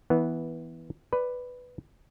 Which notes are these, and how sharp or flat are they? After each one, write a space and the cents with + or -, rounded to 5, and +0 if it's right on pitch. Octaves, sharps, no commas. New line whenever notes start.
E3 -20 B3 -5
B4 +5 D5 +0